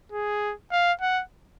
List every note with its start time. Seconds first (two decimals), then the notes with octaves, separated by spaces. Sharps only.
0.12 G#4
0.72 F5
1.01 F#5